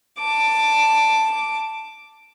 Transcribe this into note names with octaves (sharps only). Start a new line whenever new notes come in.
A5 D6